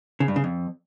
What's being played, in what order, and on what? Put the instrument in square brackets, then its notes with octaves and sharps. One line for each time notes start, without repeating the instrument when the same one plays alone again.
[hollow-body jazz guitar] C#3
G2
C#3
F2